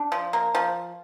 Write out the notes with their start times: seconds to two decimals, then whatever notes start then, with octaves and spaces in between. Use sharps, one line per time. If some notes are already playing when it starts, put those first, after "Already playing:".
Already playing: D4
0.12 F3
0.33 A#3
0.55 F3